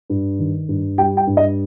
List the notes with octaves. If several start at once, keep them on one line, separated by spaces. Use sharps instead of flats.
G2
D#3
G2
G3 G5
G5
G2
D#5